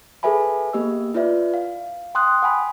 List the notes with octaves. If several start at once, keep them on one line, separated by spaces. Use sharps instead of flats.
G#4 A4 B4 E5 G#5 B5
A#3 B3 G4 D#5 E6
E4 F4 B4 D5 E5
F5
G5 C6 D#6 F#6
F#5 G#5 B5